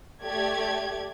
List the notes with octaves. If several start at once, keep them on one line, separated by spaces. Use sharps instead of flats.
A3 G4 D5 G#6